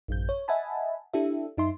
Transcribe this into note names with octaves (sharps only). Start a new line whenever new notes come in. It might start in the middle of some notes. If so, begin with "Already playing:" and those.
A1 F#2 G6
C#5
D#5 E5 F#5 G#5 A5 B5
D4 E4 G4 A4 E5
F#2 D#4 E5 C6